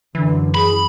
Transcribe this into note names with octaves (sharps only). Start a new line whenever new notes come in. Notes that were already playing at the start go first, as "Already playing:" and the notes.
F#2 D3 E3
G#4 B5